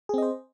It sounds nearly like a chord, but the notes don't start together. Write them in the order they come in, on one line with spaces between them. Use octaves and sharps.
G#4 C4 D#5 C5